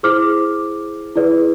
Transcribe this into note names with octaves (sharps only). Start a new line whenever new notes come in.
E4 G#4 C5 D6 F6
E4 G#4 B4 D5